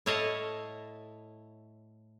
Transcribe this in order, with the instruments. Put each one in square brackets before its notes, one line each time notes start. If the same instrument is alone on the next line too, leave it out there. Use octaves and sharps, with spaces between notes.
[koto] A2 E4 C#5 D#5 F5 A5